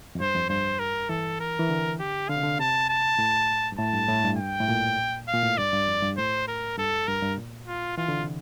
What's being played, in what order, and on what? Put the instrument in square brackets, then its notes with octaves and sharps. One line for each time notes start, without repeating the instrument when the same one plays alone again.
[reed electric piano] F2
[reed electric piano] G2 [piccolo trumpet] C5
[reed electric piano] F2
[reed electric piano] G2 [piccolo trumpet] C5
[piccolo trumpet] A#4
[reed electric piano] E3 [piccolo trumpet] A4
[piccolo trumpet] A#4
[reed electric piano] E3
D3
[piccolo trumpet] G4
[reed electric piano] D3 [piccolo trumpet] F5
[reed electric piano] C3
D3
[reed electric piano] C3 [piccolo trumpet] A5
[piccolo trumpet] A5
[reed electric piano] A2
G2
[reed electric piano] A2 [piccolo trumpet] A5
[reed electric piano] G2
A2
G2
[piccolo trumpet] G5
[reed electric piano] A2
A#2
[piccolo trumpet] F5
[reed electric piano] A#2
A2
[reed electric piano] G2 [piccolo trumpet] D5
[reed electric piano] G2
F2
G2
[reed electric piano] A2 [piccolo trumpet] C5
[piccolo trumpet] A#4
[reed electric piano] G2 [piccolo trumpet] A4
[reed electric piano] G2 [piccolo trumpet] A#4
[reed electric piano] G2
A#2
[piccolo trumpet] F4
[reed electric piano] E3 [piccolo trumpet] F4
[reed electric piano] D3
C3